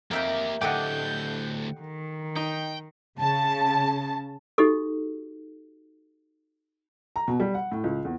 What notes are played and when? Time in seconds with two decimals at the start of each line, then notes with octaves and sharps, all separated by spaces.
0.11 F2 A#3 G4 A#4 E5 G5
0.61 D2 A2 G4 A4 D#5 F#5 G5 G6
1.81 D#3
2.36 D#4 G5
3.18 C#3 A5
4.58 D#4 F#4 G4 A4
7.16 A#5
7.28 B2
7.40 G3
7.54 F#5
7.72 A2
7.84 C#2
8.05 E2